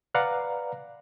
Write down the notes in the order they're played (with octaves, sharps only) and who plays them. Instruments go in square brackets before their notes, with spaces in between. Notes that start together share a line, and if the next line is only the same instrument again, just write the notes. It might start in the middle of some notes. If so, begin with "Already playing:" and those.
[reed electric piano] B4 D5 F5 F#5 A#5